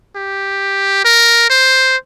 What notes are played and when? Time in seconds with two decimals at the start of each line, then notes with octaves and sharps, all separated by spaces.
0.16 G4
1.05 A#4
1.50 C5